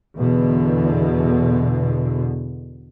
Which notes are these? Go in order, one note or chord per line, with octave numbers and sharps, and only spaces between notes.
E2 B2 D3